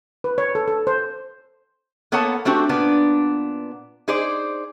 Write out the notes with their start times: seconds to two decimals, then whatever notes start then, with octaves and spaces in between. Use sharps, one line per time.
0.24 B4
0.38 C#5
0.55 A4
0.68 A4
0.87 C5
2.12 A#3 B3 A4 C#5 F#5 A5
2.45 A3 C4 D4 F#4 G4
2.69 A#2 B3 D4
4.08 D#4 G#4 C5 D5